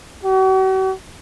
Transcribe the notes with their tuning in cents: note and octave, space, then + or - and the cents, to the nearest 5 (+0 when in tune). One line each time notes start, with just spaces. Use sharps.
F#4 +45